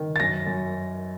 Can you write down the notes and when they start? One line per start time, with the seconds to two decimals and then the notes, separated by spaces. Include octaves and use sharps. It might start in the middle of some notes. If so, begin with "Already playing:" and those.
Already playing: D#3
0.16 A6
0.20 F#2 A#6
0.47 F#2